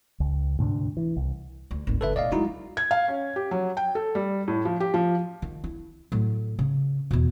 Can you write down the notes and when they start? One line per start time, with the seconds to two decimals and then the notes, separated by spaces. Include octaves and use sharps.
0.20 C#2
0.59 D2 G#2 C3 D4
0.97 E3
1.17 C2
1.71 D2
1.87 G#1 D2
2.01 G1 D3 A4 B4 E5
2.16 B1 A2 D5 D#5 F5
2.32 F#3 G#3 D#4 E4 F#4
2.77 G#6
2.91 F5
3.08 C#4
3.36 G4
3.51 F#3
3.77 G5
3.95 A4
4.15 G3
4.48 A2
4.65 F3
4.80 G4
4.94 F3
5.42 D#3
5.64 E4
6.12 A2 F#3
6.59 C#3
7.11 E2 B2